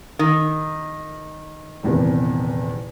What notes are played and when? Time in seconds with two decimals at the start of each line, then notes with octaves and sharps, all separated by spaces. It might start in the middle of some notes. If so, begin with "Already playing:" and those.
0.19 D#3
1.83 D#1 E2 C3